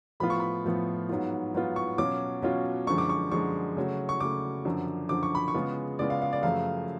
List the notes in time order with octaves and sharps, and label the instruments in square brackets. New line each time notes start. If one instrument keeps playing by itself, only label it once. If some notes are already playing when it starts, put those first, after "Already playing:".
[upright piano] A2 F3 B3 F4 B5
C#6
B5
A2 F3 B3 F4
G#2 F#3 B3 F4
G#2 F#3 B3 F4
C#6
B2 F#3 C#4 F4 D6
B2 F#3 C#4 F4
F#2 D3 F3 G#3 C#6
D6
C#6
F#2 D3 F3 G#3 C#6
C#3 F#3 A3
C#6
C#3 F#3 A3 D6
F#2 D3 F3
F#2 D3 F3 D6
C#6
B5
C#6
C#3 G#3 B3 F4
C#3 G#3 B3 F4 D5
F5
F5
D5
F#2 C#3 F3 A3 F5